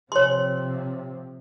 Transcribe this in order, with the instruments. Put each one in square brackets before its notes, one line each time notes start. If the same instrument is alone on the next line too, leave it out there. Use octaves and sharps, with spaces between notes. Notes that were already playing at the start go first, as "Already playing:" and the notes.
[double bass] C3 F3 [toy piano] C#5 C6